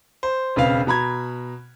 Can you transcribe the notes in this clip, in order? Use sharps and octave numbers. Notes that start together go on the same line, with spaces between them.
C5
E1 C#3 C4 B4 F5 F6
B2 A#5 B5 G#6